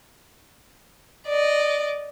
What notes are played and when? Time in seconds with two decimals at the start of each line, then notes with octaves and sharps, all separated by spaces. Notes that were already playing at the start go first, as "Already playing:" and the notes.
1.27 D5 D#5